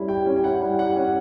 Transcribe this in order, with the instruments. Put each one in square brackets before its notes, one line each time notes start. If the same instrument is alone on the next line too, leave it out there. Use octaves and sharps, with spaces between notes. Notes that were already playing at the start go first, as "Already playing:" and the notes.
Already playing: [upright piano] G3 C#4 E4
[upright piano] G4 [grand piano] G5
[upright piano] C#4
[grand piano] G5
[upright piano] E4 [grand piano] F#5
[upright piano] G3
[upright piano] G4 [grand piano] F#5
[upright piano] C#4